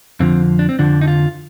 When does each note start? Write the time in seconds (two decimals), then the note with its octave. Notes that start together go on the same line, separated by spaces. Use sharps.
0.20 F2 D3 F3 C4
0.59 D4
0.69 C4
0.79 F2 D3 F3 D4
1.01 D#4
1.08 F4